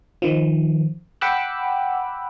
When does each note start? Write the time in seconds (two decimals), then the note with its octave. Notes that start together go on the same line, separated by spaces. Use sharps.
0.22 D#3 F3
1.21 F#5 G5 B5 D6 E6 F#6